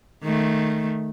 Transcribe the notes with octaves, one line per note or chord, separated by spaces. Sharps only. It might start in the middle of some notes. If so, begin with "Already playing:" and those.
D#3 A3